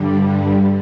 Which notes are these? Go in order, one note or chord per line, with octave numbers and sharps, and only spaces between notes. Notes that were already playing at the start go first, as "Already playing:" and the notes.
Already playing: G2 D3 G3